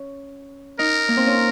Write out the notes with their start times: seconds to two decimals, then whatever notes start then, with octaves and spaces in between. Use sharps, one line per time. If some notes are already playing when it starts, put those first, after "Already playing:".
Already playing: C#4
0.79 D#4 A#4
1.08 A#3
1.17 C4
1.26 C#4